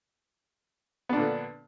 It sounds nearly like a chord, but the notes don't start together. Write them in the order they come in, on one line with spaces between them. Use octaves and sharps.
B3 D4 A#2 D3